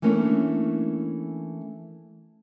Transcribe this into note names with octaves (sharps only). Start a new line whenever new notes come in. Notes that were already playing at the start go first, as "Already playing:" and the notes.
E3 A3 A#3 C#4 D4 C#5